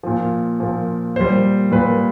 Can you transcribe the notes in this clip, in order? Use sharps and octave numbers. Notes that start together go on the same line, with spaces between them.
A#2 F3
A#2 F3
A#2 G3 C5
A#2 G3 B4